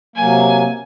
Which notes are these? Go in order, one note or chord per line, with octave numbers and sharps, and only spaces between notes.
C3 F#3 A#3 G#5